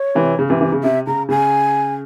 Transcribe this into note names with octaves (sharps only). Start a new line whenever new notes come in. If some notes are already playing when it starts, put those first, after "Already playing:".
Already playing: C#5
C3 E3
C#3
C3 E3
C3 E3
C#3
C3 E5
C#3 A#5
C#3 G#5